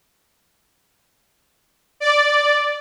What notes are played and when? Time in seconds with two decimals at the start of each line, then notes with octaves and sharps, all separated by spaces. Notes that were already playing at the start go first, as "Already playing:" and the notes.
2.00 D5